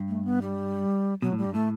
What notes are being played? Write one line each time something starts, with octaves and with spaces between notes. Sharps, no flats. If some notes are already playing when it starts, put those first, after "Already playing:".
Already playing: G2
A3
B3
G3
B2 F#3
A2
G3
G2
A2 A3